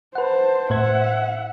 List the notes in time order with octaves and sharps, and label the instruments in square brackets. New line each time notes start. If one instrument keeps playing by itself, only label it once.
[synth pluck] B4 F#5 [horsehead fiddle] C5 A5
[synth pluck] A2 C5 G#6 [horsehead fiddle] E5 F#5